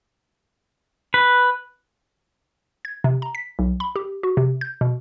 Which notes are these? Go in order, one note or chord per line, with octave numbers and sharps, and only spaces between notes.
B4
G#6
C3
A#5
B6
B1
B5
G4
F#4
C3
G6
B2